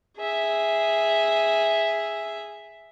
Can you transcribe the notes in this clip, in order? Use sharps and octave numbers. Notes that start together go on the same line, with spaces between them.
G#4 E5